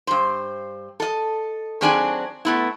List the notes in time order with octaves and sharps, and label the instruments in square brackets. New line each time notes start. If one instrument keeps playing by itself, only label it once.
[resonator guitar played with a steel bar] G2 C5
A4 D#5
D#3 F#3 C4 D4 G#4 G#5
A3 B3 E4